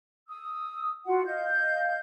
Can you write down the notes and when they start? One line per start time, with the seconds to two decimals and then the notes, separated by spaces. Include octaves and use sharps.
0.29 D#6 E6
1.07 F4 F#4 F#5
1.26 D#5 F5 G6